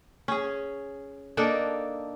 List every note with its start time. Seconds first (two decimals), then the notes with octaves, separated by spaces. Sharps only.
0.28 C#4 G#4
1.37 A#3 D4 D#4 A4